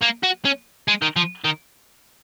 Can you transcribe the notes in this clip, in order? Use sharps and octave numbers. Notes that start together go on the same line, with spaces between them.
A#3
F#4
C#4
G#3
D#3
F3
D#3